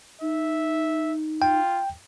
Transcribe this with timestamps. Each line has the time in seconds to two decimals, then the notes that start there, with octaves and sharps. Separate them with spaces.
0.21 D#4 E5
1.42 F4 G5